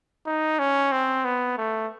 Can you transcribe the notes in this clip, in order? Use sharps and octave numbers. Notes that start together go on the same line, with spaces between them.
D#4
C#4
C4
B3
A3